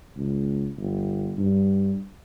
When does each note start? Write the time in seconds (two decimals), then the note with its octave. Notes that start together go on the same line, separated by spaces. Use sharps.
0.17 C#2
0.77 G1
1.38 G2